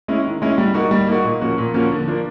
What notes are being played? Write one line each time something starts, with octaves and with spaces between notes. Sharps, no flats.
G#3 C#4 E4
D#3
G#3 C#4 E4
G3
A#3 D#4 F#4
G3
A#3 D#4 F#4
A#2
F3 A#3 C#4 F#4
A#2
F3 A#3 C#4 F#4
D3
F3 A#3 D4